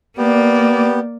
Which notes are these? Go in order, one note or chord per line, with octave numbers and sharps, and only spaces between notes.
A#3 B3 G4 D5